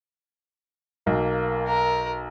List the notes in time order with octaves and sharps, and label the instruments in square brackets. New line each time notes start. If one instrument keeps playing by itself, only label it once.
[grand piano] B1 [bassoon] A#3
[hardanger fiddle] A#4